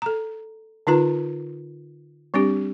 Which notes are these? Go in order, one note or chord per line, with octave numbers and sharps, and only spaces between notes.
A4 A#5
D3 D#4 F4 B4 A#5
G3 C4 D4 G4